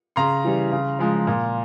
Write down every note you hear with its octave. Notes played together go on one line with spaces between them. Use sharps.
C#3 A#5 C6
E3 G3
C#3
F3 G#3
A#2